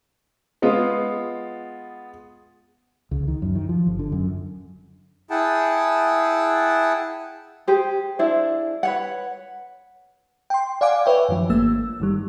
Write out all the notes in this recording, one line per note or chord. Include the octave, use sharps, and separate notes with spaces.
G#3 B3 F4
C#2
D#3
F#2
D#3
F3
G1
D3
F#2
E4 G#4 F#5 G5 A5
G4 G#4 C5
D4 E4 G#4 C5
B4 C#5 F#5
G5 C6
D5 F5 F#5 G#5 D6
B4 C#5 E5 G5
F#2 D#3 F3
G#1 A3 A#3 E6
G2 D#3 G3